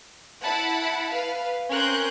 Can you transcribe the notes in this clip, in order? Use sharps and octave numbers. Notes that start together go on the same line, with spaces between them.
E4 F#5 A5 B5
B4 F5
C4 C#4 A#4 C6 F#6 G6